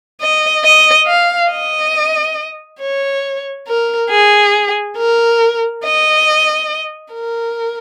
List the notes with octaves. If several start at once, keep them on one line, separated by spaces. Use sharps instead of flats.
D#5
D#5
F5
D#5
C#5
A#4
G#4
A#4
D#5
A#4